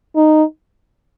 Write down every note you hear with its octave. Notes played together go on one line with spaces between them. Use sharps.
D#4